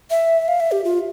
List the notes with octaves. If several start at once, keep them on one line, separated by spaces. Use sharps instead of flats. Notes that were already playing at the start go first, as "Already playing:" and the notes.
E5
F5
E5
G4
F4